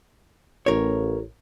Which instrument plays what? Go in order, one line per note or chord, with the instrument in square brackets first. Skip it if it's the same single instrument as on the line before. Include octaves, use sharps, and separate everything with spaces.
[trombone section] A1 [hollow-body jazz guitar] A#4 C#5